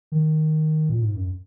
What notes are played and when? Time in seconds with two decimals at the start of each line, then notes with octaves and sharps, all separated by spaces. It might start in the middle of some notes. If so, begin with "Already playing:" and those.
0.12 D#3
0.89 A#2
1.02 G#2
1.15 F#2